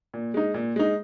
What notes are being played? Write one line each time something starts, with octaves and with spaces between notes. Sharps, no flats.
A#2
G#3 D#4
A#2
G#3 D#4